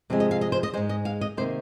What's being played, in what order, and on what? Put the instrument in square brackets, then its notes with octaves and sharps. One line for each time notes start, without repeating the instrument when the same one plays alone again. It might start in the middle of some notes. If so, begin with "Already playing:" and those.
[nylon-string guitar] C3 F3 G#3 C4
D#5
F5
D#5
C5
D#5
G#2 G#3 C5
D#5
F5
D#5
C3 D#3 A#3 C5